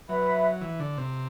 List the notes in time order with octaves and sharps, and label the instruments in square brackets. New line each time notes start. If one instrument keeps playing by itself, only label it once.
[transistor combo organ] F#3 [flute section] B4 E5 B5
[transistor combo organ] E3
D3
C3